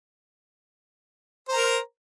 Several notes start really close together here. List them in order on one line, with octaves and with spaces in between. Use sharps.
C5 A#5 A#4